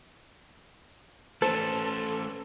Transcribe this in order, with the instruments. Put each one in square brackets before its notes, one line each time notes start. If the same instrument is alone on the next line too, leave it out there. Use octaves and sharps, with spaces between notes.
[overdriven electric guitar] A3 C#4 [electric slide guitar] A4 [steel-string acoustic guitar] C5